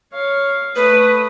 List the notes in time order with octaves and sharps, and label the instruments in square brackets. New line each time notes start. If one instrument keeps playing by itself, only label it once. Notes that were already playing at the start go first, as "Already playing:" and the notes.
[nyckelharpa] C#5 F5
[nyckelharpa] A3 D#6 [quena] B4